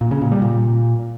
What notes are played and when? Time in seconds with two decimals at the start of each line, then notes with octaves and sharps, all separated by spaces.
0.01 A#2
0.11 C#3
0.21 A#2
0.32 G3
0.42 A#2